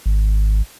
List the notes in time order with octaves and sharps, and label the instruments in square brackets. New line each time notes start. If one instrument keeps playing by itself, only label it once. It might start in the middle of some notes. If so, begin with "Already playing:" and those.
[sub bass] G#1